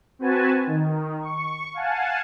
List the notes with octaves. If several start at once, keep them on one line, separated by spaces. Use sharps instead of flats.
C4 F#4 B4 G#5 A5
D#3
C#6
F5 F#5 G#5 A5